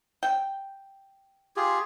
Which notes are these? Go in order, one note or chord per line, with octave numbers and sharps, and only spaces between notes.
G5
F4 G4 G#4